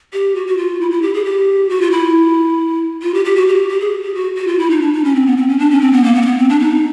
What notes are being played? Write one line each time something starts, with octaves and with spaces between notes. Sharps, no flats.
G4
F#4
F#4
F4
E4
E4
G4
G#4
G4
F#4
F4
E4
F4
G4
G4
F#4
G4
G4
G#4
G4
F#4
F#4
F4
E4
D#4
D4
D#4
C#4
C4
B3
C4
C#4
D4
C#4
C4
B3
A#3
B3
C4
B3
C4
D4
D#4